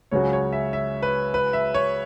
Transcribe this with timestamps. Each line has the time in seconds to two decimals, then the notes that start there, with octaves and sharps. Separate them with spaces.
0.11 C#2 C#3 F#3 C#4 F#4 C#5
0.33 C#5
0.53 E5
0.73 E5
1.03 B4
1.34 B4
1.53 E5
1.74 C#5